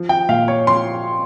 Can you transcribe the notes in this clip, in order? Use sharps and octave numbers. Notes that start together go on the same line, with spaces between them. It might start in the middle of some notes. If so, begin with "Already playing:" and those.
Already playing: F3
G5
A#2 F5
C#5
F3 C6